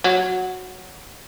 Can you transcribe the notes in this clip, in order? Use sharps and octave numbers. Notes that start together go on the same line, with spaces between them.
F#3